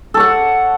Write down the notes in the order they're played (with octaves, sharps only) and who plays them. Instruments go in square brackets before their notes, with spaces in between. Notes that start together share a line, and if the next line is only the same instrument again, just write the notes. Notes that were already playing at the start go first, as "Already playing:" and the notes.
[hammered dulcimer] A4
C#5
F#5